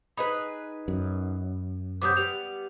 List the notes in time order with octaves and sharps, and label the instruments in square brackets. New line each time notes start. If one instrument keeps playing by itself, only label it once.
[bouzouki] D#4 G#4 B4 [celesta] D#5 B5
[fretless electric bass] F#2
[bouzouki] C3 F#3 B3 [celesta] D6 D#6 G6
[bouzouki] G3 B3 [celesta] F7